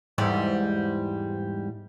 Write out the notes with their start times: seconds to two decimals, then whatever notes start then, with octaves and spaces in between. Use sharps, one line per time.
0.18 E2 G#2 G3